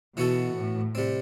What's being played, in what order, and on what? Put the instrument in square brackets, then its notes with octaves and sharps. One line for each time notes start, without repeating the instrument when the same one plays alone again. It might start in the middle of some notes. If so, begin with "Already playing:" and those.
[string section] B2 [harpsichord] E3 B3 F#4 A4
[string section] A2
[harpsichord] C3 G3 C4